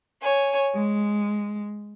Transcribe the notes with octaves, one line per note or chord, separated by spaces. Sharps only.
C#5 G#5
G#3